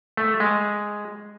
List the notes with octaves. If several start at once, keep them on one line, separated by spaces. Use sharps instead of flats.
A3
G#3